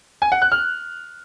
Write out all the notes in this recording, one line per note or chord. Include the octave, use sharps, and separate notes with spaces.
G#5
F#5
F#6
F6